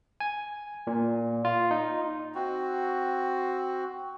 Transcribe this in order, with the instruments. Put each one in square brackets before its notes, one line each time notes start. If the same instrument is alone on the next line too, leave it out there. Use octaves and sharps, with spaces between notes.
[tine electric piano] G#5
A#2
F4
D#4
[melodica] C4 F#4